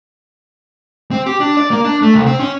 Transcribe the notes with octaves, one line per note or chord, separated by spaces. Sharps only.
C4
G4
D4
D5
A#3
D4
A3
C2
C4
C#4